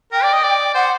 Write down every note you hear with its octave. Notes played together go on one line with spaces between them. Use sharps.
A#4 G5
D5
D#5
D5
C5 F#5